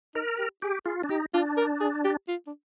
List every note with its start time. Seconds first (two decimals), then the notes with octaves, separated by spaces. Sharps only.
0.15 D#4 A#4
0.38 G4
0.62 G4 G#4
0.86 F4 G#4
1.03 D4
1.09 D#4 G4
1.34 D4 F4
1.57 A#4
1.81 G#4
2.05 G4
2.28 F4
2.47 D4